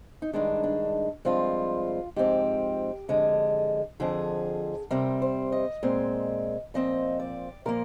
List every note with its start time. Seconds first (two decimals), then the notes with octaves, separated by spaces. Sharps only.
0.22 D#4
0.33 G2 D#3 G#3 D4
0.63 D4
1.25 G2 F3 G#3 C4 F4
2.16 G#2 F3 C4 G4
3.08 F2 D3 G#3
4.00 F2 D3 F3 G#4
4.91 C3 G3 C4 A#4
5.22 C5
5.52 D#5
5.83 A#2 G#3 C4
6.74 A#2 F3 C4 D#5
7.20 D5
7.66 A#2 F3 A#3 A#4